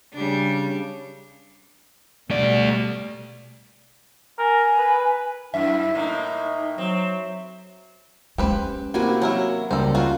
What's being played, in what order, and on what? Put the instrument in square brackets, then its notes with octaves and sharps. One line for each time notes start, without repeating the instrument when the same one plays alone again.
[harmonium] C#3 [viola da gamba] G3 D4
[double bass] B2 G3 [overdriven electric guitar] A3 D5
[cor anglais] A#4 [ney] G#5
[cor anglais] B4
[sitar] F#2 [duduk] E4 [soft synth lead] E5
[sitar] A2 A#3 [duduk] D#4
[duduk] F#3 [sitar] C4
[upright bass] G#3 C#4 [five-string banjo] G4 B4 C5
[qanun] C3 E4 G#5 [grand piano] A#3 F#4
[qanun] F#3 [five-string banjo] E4 A#4 C#5
[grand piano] C#2 G3 A#3 [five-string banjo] A4 C5
[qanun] F4 [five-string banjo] F#4 A#4